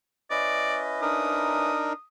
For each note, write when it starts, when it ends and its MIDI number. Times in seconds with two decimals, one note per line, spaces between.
0.31 1.71 61
0.31 1.71 64
0.31 1.71 71
0.31 0.79 74
0.31 1.01 75
1.02 1.93 62
1.02 1.93 63
1.02 1.93 70
1.02 2.05 87